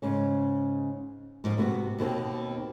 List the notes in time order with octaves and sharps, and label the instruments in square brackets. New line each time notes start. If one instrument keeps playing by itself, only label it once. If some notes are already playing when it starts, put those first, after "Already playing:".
[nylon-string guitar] G#2 C#3 C#4
G#2 F3
G#2 C3 B3 F#4
D#2 B2 D#3 C4